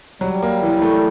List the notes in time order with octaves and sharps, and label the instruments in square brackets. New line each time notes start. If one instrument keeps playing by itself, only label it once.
[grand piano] F#3 [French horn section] G3
[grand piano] A#3
E3
A3